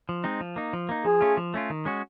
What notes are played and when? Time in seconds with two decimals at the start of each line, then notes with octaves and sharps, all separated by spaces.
0.09 F3
0.24 G#3 C4 D#4
0.41 F3
0.56 A#3 D#4
0.73 F3
0.89 A#3 D#4
1.05 F3 G#4
1.21 A3 C#4 F4
1.37 F3
1.54 A3 C#4 F4
1.70 D#3
1.85 G#3 C#4 F#4